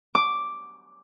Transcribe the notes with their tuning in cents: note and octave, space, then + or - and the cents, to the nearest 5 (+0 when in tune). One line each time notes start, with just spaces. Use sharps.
D6 +0